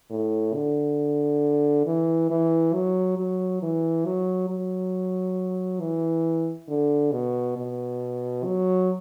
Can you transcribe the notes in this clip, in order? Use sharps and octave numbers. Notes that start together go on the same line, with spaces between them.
A2
D3
E3
E3
F#3
F#3
E3
F#3
F#3
E3
D3
B2
B2
F#3